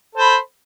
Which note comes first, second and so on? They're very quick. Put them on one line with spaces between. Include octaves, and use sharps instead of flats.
A4 C5 B5